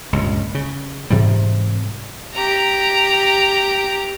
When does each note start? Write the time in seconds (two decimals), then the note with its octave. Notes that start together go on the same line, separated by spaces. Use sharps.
0.13 C#2 G2 A#2
0.55 C#3
1.10 G#2 C3 E3 G3
2.34 G4 A#5